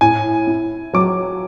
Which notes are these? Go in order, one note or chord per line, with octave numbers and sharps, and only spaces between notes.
A2 G#5
E4
F#3 D6